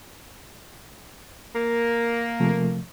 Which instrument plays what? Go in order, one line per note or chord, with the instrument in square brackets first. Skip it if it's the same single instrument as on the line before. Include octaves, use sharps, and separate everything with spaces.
[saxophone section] A#3
[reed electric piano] C3 F3 A3